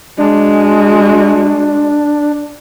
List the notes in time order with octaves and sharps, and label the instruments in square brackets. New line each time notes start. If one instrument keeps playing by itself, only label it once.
[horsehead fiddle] G#3 F#4 [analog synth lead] D4